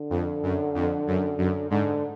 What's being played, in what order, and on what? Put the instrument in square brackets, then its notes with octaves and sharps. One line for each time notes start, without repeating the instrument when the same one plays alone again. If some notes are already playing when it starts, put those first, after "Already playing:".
Already playing: [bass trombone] D3
[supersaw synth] F2
F#2
F2
F#2
F#2
[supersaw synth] G#2 [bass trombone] D3